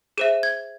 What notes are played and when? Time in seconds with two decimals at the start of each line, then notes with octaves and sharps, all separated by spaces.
0.18 G#4 C5 E5 D#7
0.43 G#6